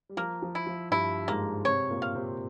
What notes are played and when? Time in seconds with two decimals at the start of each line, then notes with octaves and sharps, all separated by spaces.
0.09 G3
0.17 F3 A#3
0.42 F3
0.55 E4
0.66 F3
0.91 G2 G3 E4
1.28 G#2 G#3 A#3
1.65 C3 C4 C#5
1.90 A#2 A#3
2.02 F5
2.15 C3 C4